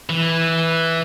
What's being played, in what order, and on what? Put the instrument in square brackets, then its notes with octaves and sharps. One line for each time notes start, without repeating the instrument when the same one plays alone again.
[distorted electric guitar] E3